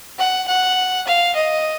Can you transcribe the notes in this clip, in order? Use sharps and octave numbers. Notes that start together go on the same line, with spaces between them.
F#5
F#5
F5
D#5